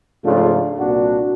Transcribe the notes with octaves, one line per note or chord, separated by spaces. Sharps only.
G#2 C#3 F3 A3 D4 F4
C2 A#2 D4 F#4